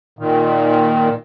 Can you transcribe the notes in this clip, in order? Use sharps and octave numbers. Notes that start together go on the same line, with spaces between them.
A#2 D#3